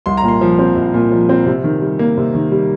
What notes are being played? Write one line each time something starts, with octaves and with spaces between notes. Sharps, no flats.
C2 C6
A#5
A#2
C6
F3
C4
C2
A#2
F3
C4
C3
D#3
G3
A#3
C3
D#3
G3